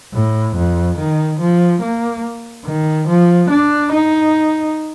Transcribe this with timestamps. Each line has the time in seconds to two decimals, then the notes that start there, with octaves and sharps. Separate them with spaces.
0.14 A2
0.56 F2
0.98 D#3
1.40 F3
1.82 A#3
2.65 D#3
3.08 F3
3.50 D4
3.92 D#4